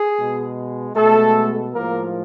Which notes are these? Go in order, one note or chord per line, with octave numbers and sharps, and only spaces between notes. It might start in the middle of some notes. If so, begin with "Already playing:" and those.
Already playing: G#4
B2 G#3
B2 G#3 A3 A4
A2 F3 G#3 A#3 A#4